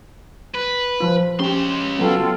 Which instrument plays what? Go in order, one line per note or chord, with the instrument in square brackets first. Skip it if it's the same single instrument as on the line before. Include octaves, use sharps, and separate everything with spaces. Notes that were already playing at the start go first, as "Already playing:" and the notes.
[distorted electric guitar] B4
[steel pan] F3 F4
[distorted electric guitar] C#3 C6 [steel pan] C#4 G4
[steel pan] F#3 B3 [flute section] F4 A4 G5